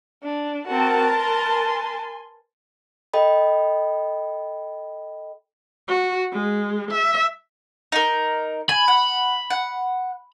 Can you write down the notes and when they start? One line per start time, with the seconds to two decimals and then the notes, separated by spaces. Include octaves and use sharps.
0.23 D4
0.67 C4 F#4 A#4 B4 A5
1.10 G#5 C6
3.13 A4 D#5 G5 B5
5.88 F#4
6.32 G#3
6.92 E5
7.92 D#4 A#4
8.69 G#5 B5
8.88 F#5
9.50 F#5